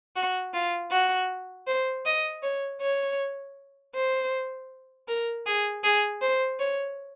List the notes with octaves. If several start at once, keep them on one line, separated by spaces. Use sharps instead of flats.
F#4
F4
F#4
C5
D#5
C#5
C#5
C5
A#4
G#4
G#4
C5
C#5